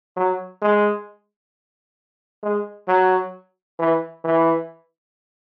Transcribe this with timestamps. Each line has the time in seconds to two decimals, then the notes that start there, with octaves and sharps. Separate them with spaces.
0.16 F#3
0.62 G#3
2.43 G#3
2.88 F#3
3.79 E3
4.24 E3